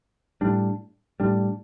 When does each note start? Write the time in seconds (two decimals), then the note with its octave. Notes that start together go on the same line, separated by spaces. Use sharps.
0.41 A2 G3 D4
1.20 A2 G3 D4